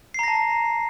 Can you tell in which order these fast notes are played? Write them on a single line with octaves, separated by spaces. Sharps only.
C7 A#5 A#6 A5